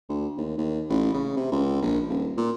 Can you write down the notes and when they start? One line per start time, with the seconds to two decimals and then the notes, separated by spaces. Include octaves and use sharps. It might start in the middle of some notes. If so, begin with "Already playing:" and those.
0.09 D2
0.37 D#2
0.58 D#2
0.90 A1
1.14 C#3
1.37 C3
1.52 C#2
1.82 A#1
2.09 D#1
2.37 A#2